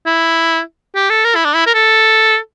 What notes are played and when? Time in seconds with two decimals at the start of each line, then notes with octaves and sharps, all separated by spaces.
0.06 E4
0.95 G4
1.10 A4
1.25 A#4
1.35 E4
1.45 D4
1.55 E4
1.67 A#4
1.74 A4